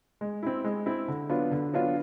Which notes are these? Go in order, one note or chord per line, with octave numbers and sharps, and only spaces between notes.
G#3
C4 E4
G#3
C4 E4
D3
F#3 B3 D4 F4
D3
F#3 B3 D4 F4